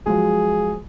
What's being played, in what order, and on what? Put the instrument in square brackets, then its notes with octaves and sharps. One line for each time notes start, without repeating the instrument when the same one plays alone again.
[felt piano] F3 F#3 G#3 [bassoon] G#4